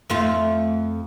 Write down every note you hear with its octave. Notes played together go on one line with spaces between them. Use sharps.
F2 A3 F4